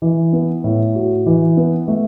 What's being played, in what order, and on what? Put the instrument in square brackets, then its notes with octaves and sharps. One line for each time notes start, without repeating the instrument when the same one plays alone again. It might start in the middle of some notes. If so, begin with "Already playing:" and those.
[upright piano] E3
B3
A2
F#4
E3
B3
A3